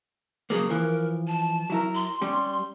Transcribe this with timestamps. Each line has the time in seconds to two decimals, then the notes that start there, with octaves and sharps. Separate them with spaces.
0.50 C#3 F#3 A#3 G#4
0.69 E3 F3 A#4
1.28 A5
1.70 F#3 E4 A#4
1.95 C6
2.22 G3 C#4